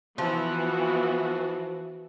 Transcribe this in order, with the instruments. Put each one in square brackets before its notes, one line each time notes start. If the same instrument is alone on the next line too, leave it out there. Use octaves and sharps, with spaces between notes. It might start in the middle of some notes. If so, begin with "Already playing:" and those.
[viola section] E3 B3 F#4 [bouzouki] F3